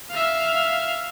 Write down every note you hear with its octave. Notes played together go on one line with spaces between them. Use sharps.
E5 F5